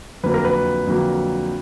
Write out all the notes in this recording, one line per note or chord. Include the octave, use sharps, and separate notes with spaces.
F2 D3 F#3 A#3 B4
A#4
B4
F2 D3 F#3 A#3